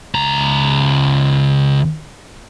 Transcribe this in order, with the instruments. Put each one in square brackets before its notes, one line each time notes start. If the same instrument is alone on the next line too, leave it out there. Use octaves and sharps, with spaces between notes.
[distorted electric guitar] C#2 A#5